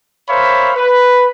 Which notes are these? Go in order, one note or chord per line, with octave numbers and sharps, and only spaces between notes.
A#4 C5 C#5 E5 F5 B5
B4